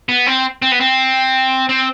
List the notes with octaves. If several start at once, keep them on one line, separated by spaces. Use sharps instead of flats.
B3
C4
C4
B3
C4
C4